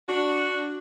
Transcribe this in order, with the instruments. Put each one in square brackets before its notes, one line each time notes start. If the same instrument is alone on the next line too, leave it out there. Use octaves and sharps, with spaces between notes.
[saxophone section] D4 F#4